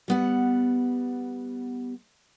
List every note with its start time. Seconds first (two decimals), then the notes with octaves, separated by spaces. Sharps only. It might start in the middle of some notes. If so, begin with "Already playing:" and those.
0.08 G3 B3 F#5